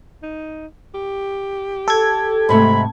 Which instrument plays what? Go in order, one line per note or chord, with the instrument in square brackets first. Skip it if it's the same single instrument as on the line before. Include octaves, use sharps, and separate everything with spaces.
[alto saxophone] D#4
G4
[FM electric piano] A4 G#6
[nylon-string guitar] G#2 C3 A3 [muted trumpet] B5